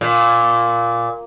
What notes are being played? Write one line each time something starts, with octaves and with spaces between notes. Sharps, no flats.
A#2